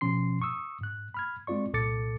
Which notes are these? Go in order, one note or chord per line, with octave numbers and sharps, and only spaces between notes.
B2 F3 C#4 C6 C7
C#6 D#6 E6
G#2 F#6
B5 F6 G#6
G#3 C4 F4 D5 C#6
C2 A#2 A4 D6 A6 C#7